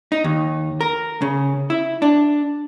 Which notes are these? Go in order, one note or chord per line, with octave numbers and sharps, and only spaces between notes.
D#4
D#2
A#4
C#3
E4
D4